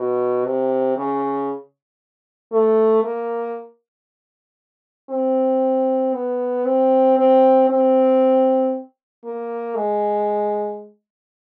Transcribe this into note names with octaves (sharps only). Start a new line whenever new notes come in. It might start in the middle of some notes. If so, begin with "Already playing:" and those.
Already playing: B2
C3
C#3
A3
A#3
C4
B3
C4
C4
C4
A#3
G#3